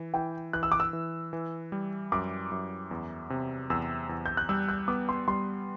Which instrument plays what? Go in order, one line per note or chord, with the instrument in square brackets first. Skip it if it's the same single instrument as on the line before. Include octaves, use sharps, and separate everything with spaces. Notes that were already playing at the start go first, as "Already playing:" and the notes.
Already playing: [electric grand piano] E3
[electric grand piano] E3 [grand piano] G5
[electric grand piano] E3 [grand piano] F#6
[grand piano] E6
D6
E6
[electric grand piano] E3
E3
G3
[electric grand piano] F#2 [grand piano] D6
[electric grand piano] F#2
E2
C3
[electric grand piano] E2 [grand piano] E6
[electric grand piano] E2
[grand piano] G6
F#6
[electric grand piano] G3 [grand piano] E6
[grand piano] F#6
[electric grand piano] B3 [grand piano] D6
[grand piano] C6
[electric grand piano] G3 [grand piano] C6